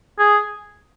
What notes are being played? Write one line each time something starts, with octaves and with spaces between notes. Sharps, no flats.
G#4